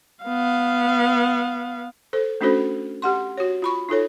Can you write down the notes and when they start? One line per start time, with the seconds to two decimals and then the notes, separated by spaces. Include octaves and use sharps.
0.25 B3 F5
2.13 A4 C5
2.41 A3 C#4 D4 F#4 A4 C5
3.02 G4 F#5 C6
3.38 F#4 C#5
3.62 F4 B5 C#6
3.89 D#4 F4 A4 C#5